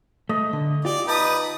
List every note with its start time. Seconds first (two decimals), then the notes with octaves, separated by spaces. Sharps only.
0.29 A3 D#5
0.53 D3
0.85 F4 G4 D5
1.07 D#4 B4 A5 D#6